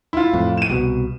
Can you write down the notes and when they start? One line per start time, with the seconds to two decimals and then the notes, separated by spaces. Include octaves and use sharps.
0.13 E4 F4
0.33 F2 A2
0.58 D#7 E7
0.70 C2 B2